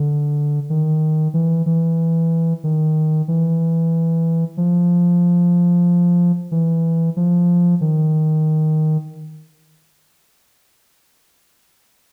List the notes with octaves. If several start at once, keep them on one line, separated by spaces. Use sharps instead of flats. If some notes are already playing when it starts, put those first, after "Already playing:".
Already playing: D3
D#3
E3
E3
D#3
E3
F3
E3
F3
D#3